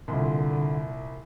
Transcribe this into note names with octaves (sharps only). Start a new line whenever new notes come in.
C2 A#2 D3 C6